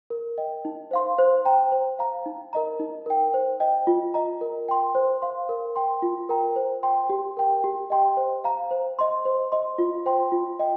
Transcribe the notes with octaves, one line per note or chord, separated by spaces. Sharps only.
A#4
D#5 G5
D#4
C5 F5 C6
C5
G5 A#5
C5
F5 A#5
D#4
A#4 D#5 A#5
D#4
A#4 G5
C5
D#5 G5
F4
D#5 A#5
A#4
G5 C6
C5
F5 C6
A#4
G5 C6
F4
A#4 G5 A#5
C5
G5 C6
G4
A#4 G5
G4
D#5 G5 C6
C5
F5 A#5
C5
D#5 C6
C5
D#5 C6
F4
C5 G5 C6
F4
D#5 G5